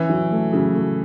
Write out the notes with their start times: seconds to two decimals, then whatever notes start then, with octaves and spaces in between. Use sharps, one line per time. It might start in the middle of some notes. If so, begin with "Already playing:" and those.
Already playing: E3 C#4
0.10 F#3
0.32 A3
0.53 C#3 F#3
0.75 A3